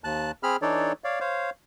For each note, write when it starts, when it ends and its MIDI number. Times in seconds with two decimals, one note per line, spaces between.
0.04 0.31 39
0.04 0.31 81
0.04 0.31 90
0.43 0.56 60
0.43 0.56 68
0.43 0.56 83
0.43 0.56 89
0.62 0.93 52
0.62 0.93 62
0.62 0.93 63
0.62 0.93 69
0.62 0.93 73
0.62 0.93 74
1.04 1.20 73
1.04 1.20 74
1.04 1.20 77
1.20 1.50 72
1.20 1.50 73
1.20 1.50 77